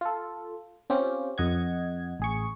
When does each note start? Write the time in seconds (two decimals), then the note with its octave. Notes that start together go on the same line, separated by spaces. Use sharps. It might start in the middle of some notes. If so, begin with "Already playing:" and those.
0.01 F4 A4
0.90 C4 C#4 F4 G4
1.38 F2 D#5 F#5 G#6
2.20 A1 G#4 C#6